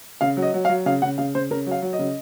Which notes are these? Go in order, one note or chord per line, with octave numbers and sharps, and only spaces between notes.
C#3 F5
F#3
D#5
F#3
F5
F#3
C#3 F5
C#3 F#5
C#3 F5
C#3 C5
C#3 A#4
F#3 F5
F#3
D#5
C#3